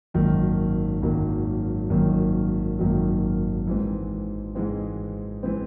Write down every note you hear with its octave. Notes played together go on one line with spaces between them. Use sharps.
G#1 F#2 D#3 F#3 A#3
G#1 F#2 D#3 F#3 A#3
G#1 F#2 D#3 F#3 A#3
G#1 F#2 D#3 F#3 A#3
G#2 E3 G#3 C4
G#2 E3 G#3 C4
E3 G#3 C4